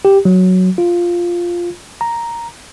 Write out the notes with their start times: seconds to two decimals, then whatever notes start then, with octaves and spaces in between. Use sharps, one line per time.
0.05 G4
0.25 F#3
0.78 F4
2.01 A#5